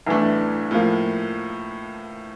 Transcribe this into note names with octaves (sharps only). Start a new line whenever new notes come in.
B1 A2 E3 A3 D4
A2 F3 A#3